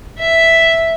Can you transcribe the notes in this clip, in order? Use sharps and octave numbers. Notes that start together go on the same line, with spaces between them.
E5